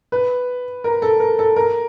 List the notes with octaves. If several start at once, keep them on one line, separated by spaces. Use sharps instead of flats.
B4
A#4
A4
A#4
A4
A#4